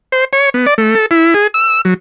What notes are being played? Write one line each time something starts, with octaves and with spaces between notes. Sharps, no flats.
C5
C#5
B3
D5
A3
A4
E4
G#4
E6
F#3